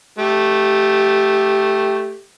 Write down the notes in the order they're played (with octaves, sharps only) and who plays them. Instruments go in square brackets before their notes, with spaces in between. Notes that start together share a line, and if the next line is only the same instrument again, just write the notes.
[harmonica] A3 G4